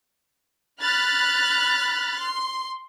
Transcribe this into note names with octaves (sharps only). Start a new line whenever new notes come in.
B5 F6 F#6 A6
C6